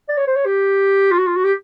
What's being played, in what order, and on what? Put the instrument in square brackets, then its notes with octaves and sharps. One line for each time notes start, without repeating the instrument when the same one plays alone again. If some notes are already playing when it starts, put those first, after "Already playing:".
[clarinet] D5
C#5
C5
C#5
G4
F4
F#4
F4
F#4
G4